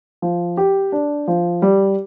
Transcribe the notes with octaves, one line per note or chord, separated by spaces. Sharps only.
F3
G4
D4
F3
G3